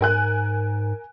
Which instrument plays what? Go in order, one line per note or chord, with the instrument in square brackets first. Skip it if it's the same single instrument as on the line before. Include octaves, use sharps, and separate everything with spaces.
[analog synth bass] G#2 [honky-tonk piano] A#4 G#5 F#6